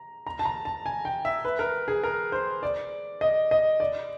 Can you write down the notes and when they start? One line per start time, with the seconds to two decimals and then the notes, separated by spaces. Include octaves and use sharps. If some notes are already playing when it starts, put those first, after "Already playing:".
Already playing: A#5
0.27 A#5
0.39 A5
0.45 A#5
0.65 A5
0.86 G#5
1.05 G5
1.25 E5
1.45 B4
1.59 A#4
1.88 G#4
2.04 A#4
2.32 C5
2.63 D5
3.21 D#5
3.51 D#5
3.80 D5